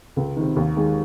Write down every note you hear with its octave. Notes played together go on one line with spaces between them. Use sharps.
C#2
C3 D#3
D#2
D#3 G#3